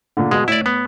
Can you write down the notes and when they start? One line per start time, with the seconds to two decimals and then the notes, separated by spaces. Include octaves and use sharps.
0.17 A#2 D3
0.31 B2 G#3
0.48 A2 E4 D5
0.66 B3